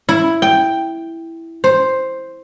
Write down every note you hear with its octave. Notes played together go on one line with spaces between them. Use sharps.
E4
G5
C5